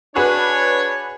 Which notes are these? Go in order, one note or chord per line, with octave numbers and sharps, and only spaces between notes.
D4 F#4 G#4 B4 C#5